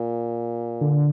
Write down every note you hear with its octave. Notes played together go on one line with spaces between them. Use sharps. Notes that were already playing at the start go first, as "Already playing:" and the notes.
Already playing: A#2
D3